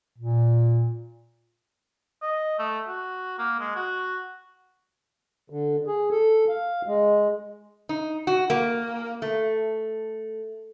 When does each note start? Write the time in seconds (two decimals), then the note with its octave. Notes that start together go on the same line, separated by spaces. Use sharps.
0.18 A#2
2.22 D#5
2.59 A3
2.88 F#4
3.38 A#3
3.59 G#3
3.76 F#4
5.50 D3
5.87 G#4
6.11 A4
6.48 F5
6.87 G#3
7.89 D#4
8.27 F#4
8.50 A#3
9.22 A3